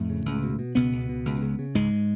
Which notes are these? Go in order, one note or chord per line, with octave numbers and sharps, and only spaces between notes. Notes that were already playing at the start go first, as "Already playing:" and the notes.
Already playing: F2 A2 A3
C#3
C#2
B2
B2
C#2 B2 B3
C#2
B2
C#2
C#3
C#3
C#2 G#2 G#3